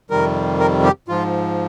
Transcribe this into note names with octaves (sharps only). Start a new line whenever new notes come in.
F2 C3 D#3 G3 A#4
A#4
G4
G#2 F3 F4